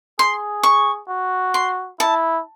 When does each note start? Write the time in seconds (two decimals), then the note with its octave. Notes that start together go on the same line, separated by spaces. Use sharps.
0.19 G#4 C6
0.63 C#6
1.09 F#4
1.54 C6
2.00 E4 A5